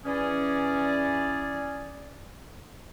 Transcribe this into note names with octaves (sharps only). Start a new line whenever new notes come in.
E3 C#4 G#4 D5